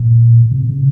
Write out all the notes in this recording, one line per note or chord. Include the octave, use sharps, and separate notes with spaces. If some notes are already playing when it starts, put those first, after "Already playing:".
Already playing: A#2
A#2
C3
C#3